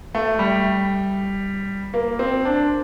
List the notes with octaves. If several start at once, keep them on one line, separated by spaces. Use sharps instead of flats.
A3
G3
A#3
C4
D4